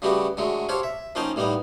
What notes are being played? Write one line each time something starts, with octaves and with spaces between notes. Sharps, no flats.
C#3 G3 A3 B3 F#4 G4
D3 F#3 G#3 A3
G4 A4 C5 C#5 F5
E5
F3 A#3 C#4 D#4 G5 A5
A2 G3 A#3 B3 D#4